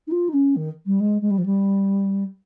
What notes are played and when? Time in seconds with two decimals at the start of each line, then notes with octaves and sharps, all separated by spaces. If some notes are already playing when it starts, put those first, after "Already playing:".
0.07 D#4
0.11 F4
0.28 D#4
0.33 C#4
0.56 D#3
0.86 G3
1.00 G#3
1.21 G#3
1.30 G3
1.38 F3
1.45 G3